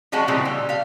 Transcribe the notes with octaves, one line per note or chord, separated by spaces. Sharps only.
F3 G3 G#3 C#4 F#4
A#2 C#3 E3 G3 C4
G3
G4 F5